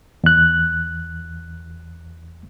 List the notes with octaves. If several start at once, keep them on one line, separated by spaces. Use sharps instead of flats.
E2 F#6